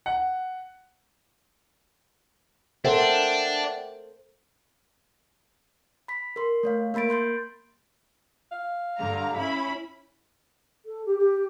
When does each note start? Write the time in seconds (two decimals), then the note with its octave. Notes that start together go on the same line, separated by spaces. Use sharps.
0.06 F#5
2.85 D4 A4 A#4 C5 E5 F#5 G5
6.08 B5 B6
6.36 A#4 C6
6.63 A3 C#5 F5
6.94 A#3 A#4 B5 A6 D7
7.09 B5 C6 G6 A6
8.52 F5
8.99 G2 D3 A#5
9.37 C#4 E4 B5
10.85 A4
11.06 G4
11.18 G4